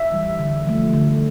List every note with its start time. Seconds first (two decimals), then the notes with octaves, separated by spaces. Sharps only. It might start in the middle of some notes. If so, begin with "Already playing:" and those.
Already playing: E5
0.12 E3 G3
0.39 D3
0.67 F3 A3
0.93 D3